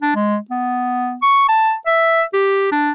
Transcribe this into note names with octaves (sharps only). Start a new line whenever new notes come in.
D4
G#3
B3
C#6
A5
E5
G4
D4